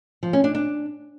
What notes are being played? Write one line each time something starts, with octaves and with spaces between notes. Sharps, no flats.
F3
C#4
D4
D4